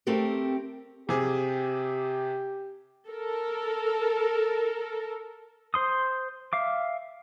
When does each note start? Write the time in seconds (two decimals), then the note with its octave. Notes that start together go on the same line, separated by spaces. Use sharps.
0.07 A3 C4 G4 A4 A#4
1.09 C3 G4 G#4
3.10 A4 A#4
5.74 C5 C6 D#6
6.53 E5 F5 D6